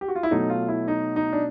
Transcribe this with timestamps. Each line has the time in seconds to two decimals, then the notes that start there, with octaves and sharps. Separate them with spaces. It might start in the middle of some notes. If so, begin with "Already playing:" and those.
0.01 G4
0.08 F#4
0.16 F4
0.23 E4
0.31 B2 F#3 A3 D#4
0.50 F4
0.68 E4
0.88 D#4
1.16 D#4
1.33 D4